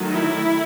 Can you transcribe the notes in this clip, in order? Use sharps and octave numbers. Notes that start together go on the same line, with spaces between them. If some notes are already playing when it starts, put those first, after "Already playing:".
Already playing: D#3 F#3 A3
E4